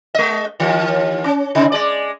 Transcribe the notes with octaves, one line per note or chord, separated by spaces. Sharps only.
G#3 D#5
D#2 E3
C#4
C3 D#4
G#3 D5